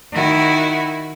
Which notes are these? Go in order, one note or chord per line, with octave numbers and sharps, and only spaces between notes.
D#3 E4 F#4